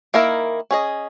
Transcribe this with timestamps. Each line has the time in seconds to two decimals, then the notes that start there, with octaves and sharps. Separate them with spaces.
0.14 D#3 A#3 E4 A#4
0.71 C#4 G#4 D#5